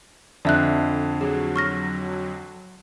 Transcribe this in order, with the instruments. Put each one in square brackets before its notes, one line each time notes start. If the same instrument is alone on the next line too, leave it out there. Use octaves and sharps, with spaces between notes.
[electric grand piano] F2 D3 [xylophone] D5 E5 F#6
[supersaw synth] F#3 [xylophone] G#4
[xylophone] C#6 F6 A#6